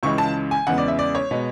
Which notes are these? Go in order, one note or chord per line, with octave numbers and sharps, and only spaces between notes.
C#2 C#3 E3 G#3 C#6
A5
G#5
E2 C#3 G#3 B3 F#5
D5
E5
D5
C#5
B2 G#3 B3